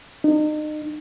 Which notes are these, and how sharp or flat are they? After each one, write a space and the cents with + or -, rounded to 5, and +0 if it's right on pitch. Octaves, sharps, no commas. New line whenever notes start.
D#4 -35